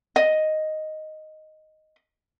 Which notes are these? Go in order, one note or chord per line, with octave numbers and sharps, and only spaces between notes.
D#5